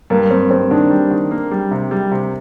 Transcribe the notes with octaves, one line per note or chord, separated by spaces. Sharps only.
G2 A#3
G2 C4
G2 C4
D#3 D4
G3
D#3
A#3
G3
C3
G3
C3